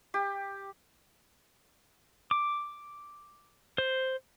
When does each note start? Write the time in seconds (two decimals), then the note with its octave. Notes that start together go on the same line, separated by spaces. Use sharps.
0.14 G4
2.31 D6
3.78 C5